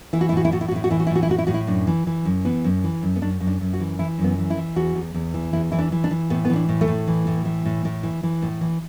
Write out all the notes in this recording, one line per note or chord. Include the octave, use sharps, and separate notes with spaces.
E3 E4
F#4
E4
A2 F#4
E4
A2 F#4
E4
F#4
A2 E4
F#4
E3 E4
F#4
E4
A2
F#4
E4
A2 F#4
E4
A2 F#4
E4
F#2 D4
E3
E3
F#2
E3 B3
F#2
E3
F#2
B3
F#2 D4
F#2
D4
F#2
F#4
E3
E3 E4
F#2
B3
E3
E4
E3
E2 F#4
E2
E2
E3
E2 E4
E3 E4
D4
E3
D4
E3
A2 B3
E3 B3
D4
A2
A3
A2
E3
A2
E3
A2
A2
E3
E3
A2
E3